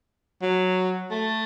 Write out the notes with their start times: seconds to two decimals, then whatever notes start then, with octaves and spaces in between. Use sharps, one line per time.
0.43 F#3
1.11 A3